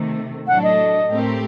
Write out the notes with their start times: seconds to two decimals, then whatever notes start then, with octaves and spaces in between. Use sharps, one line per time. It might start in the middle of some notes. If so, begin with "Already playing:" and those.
Already playing: C3 D#3 A3
0.48 A2 F#3 A3 D4 A4 F#5
0.63 D#5
1.10 A2 A3 C4 G4 A#4